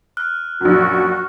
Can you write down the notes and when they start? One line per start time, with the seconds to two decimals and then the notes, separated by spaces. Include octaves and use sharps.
0.17 F6 F#6
0.61 A#1 F#2 F#4